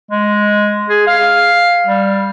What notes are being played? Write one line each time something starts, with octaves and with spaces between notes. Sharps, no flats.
G#3
G#4
F5
G3